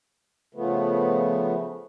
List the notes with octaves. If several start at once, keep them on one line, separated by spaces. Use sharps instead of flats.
C#3 F3 A3 B3